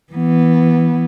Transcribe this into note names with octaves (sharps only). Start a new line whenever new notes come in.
E3 B3